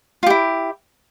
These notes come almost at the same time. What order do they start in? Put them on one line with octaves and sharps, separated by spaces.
F4 G4 E4